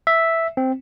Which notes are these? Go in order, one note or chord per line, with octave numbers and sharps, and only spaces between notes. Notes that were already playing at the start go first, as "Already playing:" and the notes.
E5
C4